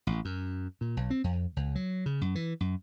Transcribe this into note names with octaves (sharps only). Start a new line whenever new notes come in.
A1
F#2
A#2
B1
C4
F2
C#2
F#3
C#3
F#2
E3
F#2